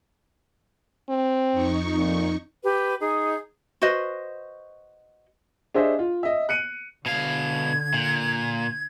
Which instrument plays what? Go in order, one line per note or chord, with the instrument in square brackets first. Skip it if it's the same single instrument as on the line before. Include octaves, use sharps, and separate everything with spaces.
[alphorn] C4
[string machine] F2 D#4 C#6
[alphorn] A#2
[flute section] G4 B4
D#4 G#4
[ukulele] F#4 B4 C5 D#5
[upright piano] D4 G4 G#4 C5 D#5 E5
F4
D#5 E5
F#6 C#7 D#7
[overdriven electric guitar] B2 F5 [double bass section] D3 [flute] G#6
[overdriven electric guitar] A#2